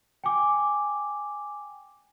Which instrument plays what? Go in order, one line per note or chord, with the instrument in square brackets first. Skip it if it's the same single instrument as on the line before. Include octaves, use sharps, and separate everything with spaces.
[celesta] G5 G#5 D6